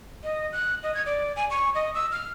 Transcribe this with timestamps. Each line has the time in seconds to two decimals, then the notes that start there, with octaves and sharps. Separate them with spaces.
0.23 D#5
0.52 F#6
0.83 D#5
0.94 G#6
1.06 D5
1.36 G#5
1.51 C#6
1.75 D#5
1.95 E6
2.12 F6